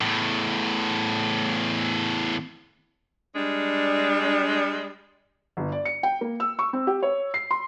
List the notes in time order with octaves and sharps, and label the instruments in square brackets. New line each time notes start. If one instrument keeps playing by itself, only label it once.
[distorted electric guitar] E2 A2
[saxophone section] G3 G#3 D4
[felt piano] G1
D5
C#7
G5
A#3
E6
C#6
C4
G4
C#5
C7
C6